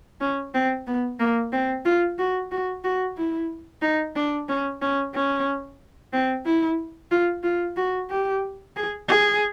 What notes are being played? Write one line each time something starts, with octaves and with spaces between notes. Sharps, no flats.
C#4
C4
B3
A#3
C4
F4
F#4
F#4
F#4
E4
D#4
D4
C#4
C#4
C#4
C4
E4
F4
F4
F#4
G4
G#4
G#4